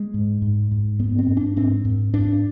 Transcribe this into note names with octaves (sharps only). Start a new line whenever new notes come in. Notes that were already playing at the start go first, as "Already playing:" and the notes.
Already playing: G#3
G#2
G#2
G#2
G2 B3
C4
G2
D4
G#2 C4
G#2
G#2 D4